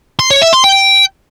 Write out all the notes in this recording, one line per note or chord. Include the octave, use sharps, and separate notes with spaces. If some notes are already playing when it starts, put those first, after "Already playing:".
C6
C#5
E5
C6
G5